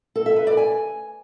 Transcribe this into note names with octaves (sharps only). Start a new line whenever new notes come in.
A4
E5
B4
D5
G#5